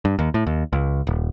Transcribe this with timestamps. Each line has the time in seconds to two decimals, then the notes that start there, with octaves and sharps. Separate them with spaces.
0.05 G2
0.19 D#2
0.34 A2
0.46 D#2
0.73 C#2
1.07 D#1